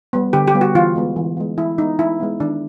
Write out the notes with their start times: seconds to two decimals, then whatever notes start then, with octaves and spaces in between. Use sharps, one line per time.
0.13 G3 B3
0.33 D3 G4
0.47 G4
0.55 G3 B3
0.61 F#4
0.75 E3 F4
0.96 G#3 B3
1.16 E3
1.37 G#3 B3
1.58 E3 E4
1.78 G#3 B3 D#4
1.99 E3 E4
2.20 G#3 B3
2.40 D#3 D4